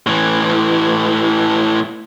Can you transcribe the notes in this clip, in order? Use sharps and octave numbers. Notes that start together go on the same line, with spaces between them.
A2 E3